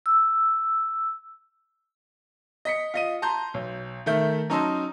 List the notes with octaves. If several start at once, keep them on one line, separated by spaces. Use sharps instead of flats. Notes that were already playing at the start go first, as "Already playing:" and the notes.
E6
D#5 B6 C#7
F4 D#5 D#7
A5 A#5 C6 G6
B1
D#3 A3 E5 G6
F#3 C#4 D#4 A5 C6 E6